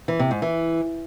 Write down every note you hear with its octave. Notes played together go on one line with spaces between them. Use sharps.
E3
C3
G#2
E3